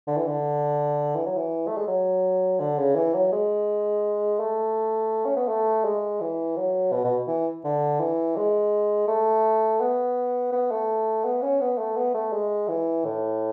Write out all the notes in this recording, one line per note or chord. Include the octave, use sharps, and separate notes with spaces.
D3
E3
D3
E3
F#3
E3
A3
G#3
F#3
D3
C#3
E3
F#3
G#3
A3
C#4
B3
A3
G#3
E3
F#3
B2
B2
E3
D3
E3
G#3
A3
B3
B3
A3
B3
C#4
B3
A3
B3
A3
G#3
E3
A2